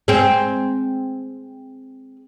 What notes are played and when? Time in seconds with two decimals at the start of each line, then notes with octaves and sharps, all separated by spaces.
0.08 G#3 C4